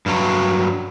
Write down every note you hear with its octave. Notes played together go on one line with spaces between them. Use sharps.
G2 F#3